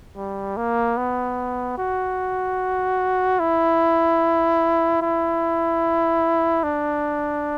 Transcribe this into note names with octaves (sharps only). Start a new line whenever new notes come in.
G3
A#3
B3
F#4
E4
E4
D4